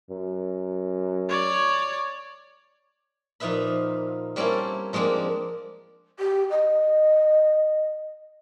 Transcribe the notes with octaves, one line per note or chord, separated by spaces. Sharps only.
F#2
C#5 D5
A#2 F3 D#4 B4 E5 B5
G3 A#3 C4 C#4 E4 A4
F3 G#3 A#3 C4 D4
G4
D#5